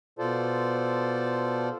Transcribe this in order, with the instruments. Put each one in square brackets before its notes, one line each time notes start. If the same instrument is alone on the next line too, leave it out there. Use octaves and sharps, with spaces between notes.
[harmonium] B2 F4 A4 C5 D5 A5